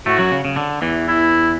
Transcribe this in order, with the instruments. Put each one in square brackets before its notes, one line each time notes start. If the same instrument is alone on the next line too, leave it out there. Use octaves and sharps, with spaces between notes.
[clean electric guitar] A2 A3 [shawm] F#4
[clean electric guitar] F#2 F#3
C#3
C#3
D3
E2 E3
[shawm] E4